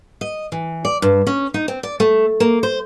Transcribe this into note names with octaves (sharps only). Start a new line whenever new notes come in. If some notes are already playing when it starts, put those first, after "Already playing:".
D#5
E3
D5
G2
C#4
D#4
C4
D5
A3
A#3
C5